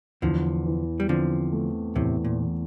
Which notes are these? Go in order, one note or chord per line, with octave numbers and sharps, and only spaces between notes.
E2 D3 F3
E3
G3
D3 F3 C4
A3
E2 A2 C3
A#2
E3